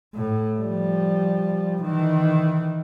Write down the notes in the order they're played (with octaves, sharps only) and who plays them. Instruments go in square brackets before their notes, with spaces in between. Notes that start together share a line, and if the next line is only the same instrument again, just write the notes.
[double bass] A2
F3 G3
D#3 E3